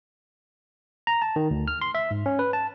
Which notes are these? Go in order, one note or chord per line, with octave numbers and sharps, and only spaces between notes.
A#5
A5
D#3
D2
F6
C6
E5
G#2
C#4
B4
A5